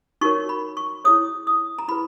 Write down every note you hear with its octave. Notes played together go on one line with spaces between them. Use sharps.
D#4 F#4 A#4 C#5 C#6
B5
C#6
E4 G#4 C#5 D#6
D#6
A#5
E4 G#4 B4 B5